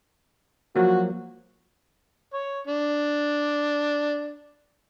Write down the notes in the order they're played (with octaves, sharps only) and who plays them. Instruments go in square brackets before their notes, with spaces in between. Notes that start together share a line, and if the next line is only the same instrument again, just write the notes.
[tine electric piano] F3 F#3 A#3 [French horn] F#4
[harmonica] C#5
D4